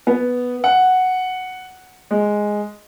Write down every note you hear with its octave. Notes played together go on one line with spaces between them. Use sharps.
B3
F#5
G#3